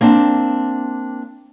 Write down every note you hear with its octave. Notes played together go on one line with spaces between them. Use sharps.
A#3 C4 D4